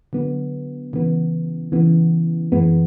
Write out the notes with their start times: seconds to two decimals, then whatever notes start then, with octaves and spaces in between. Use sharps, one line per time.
0.13 D3 F#3 B3
0.93 C#3 E3 B3
1.72 C#3 E3 B3
2.52 F#2 E3 G#3 B3